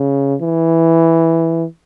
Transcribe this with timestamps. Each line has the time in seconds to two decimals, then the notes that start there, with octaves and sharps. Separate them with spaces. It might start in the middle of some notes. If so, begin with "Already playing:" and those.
Already playing: C#3
0.41 E3